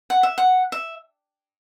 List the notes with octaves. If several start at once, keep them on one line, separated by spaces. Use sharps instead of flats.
F#5
E5
F#5
E5